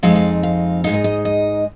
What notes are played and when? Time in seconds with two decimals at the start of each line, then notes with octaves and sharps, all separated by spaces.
0.03 F2 F3 G#3 C4 D#4 F5
0.16 F5
0.43 F5
0.84 G#2 G#3 D#4 F5
0.94 D#5
1.04 D#5
1.25 D#5